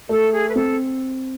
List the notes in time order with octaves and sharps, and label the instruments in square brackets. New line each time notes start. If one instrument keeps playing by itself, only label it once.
[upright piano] A3 [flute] A4
[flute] G#4
B4
[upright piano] C4 [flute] A4